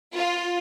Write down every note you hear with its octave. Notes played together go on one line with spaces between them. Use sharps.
F4